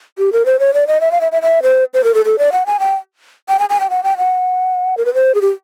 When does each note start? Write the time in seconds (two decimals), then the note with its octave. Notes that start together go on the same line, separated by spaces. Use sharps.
0.18 G4
0.33 A#4
0.46 C5
0.59 C#5
0.74 D5
0.87 D#5
1.01 E5
1.11 F5
1.21 E5
1.32 E5
1.42 E5
1.63 C5
1.94 C5
2.04 A#4
2.14 A4
2.25 A4
2.39 D5
2.52 F#5
2.66 G#5
2.80 G5
3.49 G5
3.59 G#5
3.69 G#5
3.80 G5
3.90 F#5
4.04 G5
4.17 F#5
4.97 A#4
5.05 B4
5.14 C5
5.35 G#4
5.42 G4